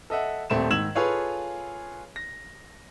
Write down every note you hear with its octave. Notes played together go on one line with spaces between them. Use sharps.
A4 D#5 E5 F#5
D#1 A3 C4 E7
G#2 D#3 E6 G#6 E7 F#7
F4 G#4 A4 B4 C#5 F5
A#6